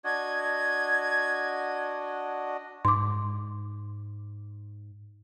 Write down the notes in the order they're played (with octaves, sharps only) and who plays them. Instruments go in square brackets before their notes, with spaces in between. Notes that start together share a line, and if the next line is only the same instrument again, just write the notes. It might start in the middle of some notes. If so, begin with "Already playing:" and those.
[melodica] D4 F#4 D#5 [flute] G#6
[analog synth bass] G#2 [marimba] C6 D6